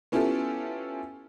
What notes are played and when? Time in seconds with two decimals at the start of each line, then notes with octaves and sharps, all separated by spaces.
0.12 B3 C#4 E4 F4 G4 A4